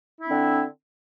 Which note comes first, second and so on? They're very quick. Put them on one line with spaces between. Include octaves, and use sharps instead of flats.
E4 D4 C4 D3